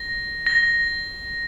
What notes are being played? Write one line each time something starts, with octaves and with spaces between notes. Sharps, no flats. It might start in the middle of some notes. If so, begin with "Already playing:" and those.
Already playing: A#6
A#6